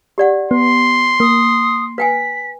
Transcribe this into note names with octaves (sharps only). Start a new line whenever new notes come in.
G4 D5 F#5
B3 C6
A#3 D#6
B4 G5 G#5 B6